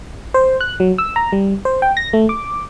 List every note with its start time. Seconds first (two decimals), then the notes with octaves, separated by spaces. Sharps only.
0.34 C5
0.61 F#6
0.80 F#3
0.98 E6
1.16 A#5
1.32 G3
1.65 C5
1.82 G5
1.97 A#6
2.13 A3
2.29 D6